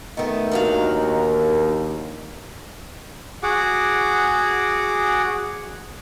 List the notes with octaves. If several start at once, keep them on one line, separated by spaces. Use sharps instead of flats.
D#3 A3 B3
D#2 D4 F#4 A#4 F5
F#4 G#4 F#5 D6